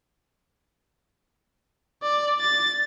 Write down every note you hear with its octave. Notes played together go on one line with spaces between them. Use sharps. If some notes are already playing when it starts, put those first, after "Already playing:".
D5
A6